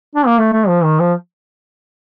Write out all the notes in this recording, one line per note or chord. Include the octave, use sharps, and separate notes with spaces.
D4
A#3
A3
A3
F3
D#3
F3